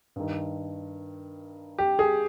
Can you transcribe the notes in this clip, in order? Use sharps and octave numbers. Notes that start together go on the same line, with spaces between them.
G2 D#3
G4
G#4